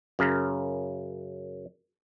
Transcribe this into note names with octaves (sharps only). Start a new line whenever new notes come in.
F#2 C#3 A#4